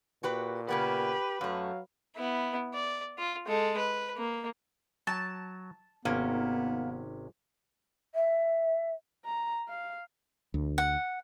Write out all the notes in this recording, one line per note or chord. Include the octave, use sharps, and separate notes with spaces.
A#2 F#4 G4 B4
C#3 A#3 B3 G4 B4
F#2 F#3 A3 F5
B3 E4
D5
F4
G#3 A4
B4
A#3
F#3 A5
G#1 C3 A#3 B3 C#4
E5
A#5
F5
D2
F#5